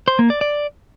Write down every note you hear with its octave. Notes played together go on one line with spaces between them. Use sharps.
C5
A#3
D5
D5